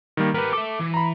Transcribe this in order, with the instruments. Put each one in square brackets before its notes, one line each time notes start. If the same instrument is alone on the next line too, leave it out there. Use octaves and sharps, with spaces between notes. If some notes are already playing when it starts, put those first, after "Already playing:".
[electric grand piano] D#3 G3 A#3
[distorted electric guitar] B3 G4 [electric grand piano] A#4 B4
[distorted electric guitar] A4 E5 [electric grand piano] D6
[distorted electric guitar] E3
[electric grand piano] A#5 B5